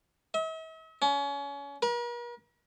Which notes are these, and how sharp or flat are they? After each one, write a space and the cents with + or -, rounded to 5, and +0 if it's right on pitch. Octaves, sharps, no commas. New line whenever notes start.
E5 -45
C#4 +30
A#4 +45